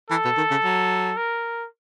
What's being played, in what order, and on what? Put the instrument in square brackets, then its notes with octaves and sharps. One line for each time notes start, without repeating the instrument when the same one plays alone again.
[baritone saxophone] E3 [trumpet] A4
[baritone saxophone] B2
D#3
C#3
F#3
[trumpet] A#4